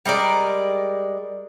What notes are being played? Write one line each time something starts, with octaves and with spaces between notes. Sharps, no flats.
G3 G#3 A#4 D5